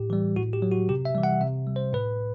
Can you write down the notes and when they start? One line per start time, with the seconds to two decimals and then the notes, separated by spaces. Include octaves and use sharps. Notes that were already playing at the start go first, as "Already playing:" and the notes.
Already playing: A2 G4
0.10 E3 G3
0.36 A2 F#4
0.53 G4
0.62 F#3
0.71 F#4
0.89 C3 G4
1.05 E5
1.15 E3 G3
1.23 F#5
1.41 C3 E5
1.67 G3
1.76 C5
1.93 A2 B4